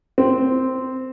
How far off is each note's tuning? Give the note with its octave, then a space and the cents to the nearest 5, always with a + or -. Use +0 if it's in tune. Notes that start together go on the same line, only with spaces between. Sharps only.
C4 -10